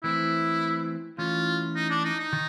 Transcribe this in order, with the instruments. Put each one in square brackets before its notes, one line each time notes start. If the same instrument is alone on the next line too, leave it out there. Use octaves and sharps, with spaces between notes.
[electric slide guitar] E3 A3 C4 [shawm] E4
[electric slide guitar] E3 A3 C#4 [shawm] F4
[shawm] D#4
D4
D#4
D#4
[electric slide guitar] D#3